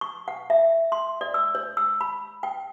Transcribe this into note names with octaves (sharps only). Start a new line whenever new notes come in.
C#6
F#5
E5
C6
D5
E6
C#5
E6
B5
G5